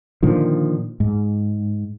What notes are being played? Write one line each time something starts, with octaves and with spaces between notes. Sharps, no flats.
A#2 D3 D#3 F3
G#2